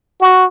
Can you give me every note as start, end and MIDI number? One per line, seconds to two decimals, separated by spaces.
0.21 0.45 66